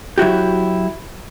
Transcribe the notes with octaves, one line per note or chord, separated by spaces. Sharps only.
F#3 E4 F#4 G4